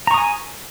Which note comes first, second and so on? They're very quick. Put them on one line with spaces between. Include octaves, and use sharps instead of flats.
A#5 C#6 D#6 G#5